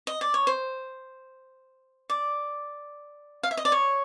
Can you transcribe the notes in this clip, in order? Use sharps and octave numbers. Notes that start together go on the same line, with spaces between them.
D#5
D5
C#5
C5
D5
F5
E5
D#5
D5
C#5